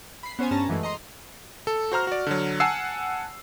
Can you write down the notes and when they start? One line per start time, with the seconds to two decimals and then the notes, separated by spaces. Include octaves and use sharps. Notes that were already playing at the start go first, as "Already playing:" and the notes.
0.23 B5 C7
0.39 B3 C#4 C5 C#5 G#5
0.51 G2 C#4 A5 A#5
0.68 F#2 E3 G#3 A3
0.83 D#5 A#5 C6
1.67 A4
1.92 F#4 C5 A#5 F6
2.07 F#4 D5
2.27 D3 F#3
2.60 F#5 G#5 A5 E6 C7